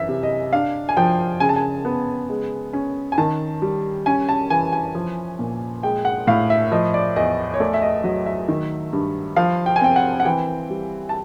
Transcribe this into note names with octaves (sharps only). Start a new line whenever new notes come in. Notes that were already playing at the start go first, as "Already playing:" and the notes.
Already playing: F#2 E3 E5
C3
D#5
D4 F5
G#5
F3 G5
C#3 G#5
A5
G#5
B3
G#3
C#4
G#5
D#3 A5
G3
C#4 G#5
A5
E3 G#5
G#5
F3
A#2
G#3 G5
F#5
A2 F5
E5
F3 D#5
D5
E2 D#5
C#5
A3 D5
E5
D#5
F#3 D#5
E5
D#3
G2
F3 F5
G5
G#5
C4 G5
F#5
F#5
E3 G5
G3
A5